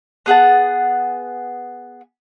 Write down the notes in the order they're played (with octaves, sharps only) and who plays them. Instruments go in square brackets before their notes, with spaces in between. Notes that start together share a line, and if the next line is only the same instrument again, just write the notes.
[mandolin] B3 G#4 F#5 A5